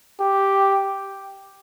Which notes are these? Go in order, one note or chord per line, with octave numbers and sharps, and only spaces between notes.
G4